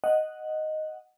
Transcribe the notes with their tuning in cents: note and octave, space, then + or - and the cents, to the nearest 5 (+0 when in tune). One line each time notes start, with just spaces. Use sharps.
D#5 +0 F#5 +0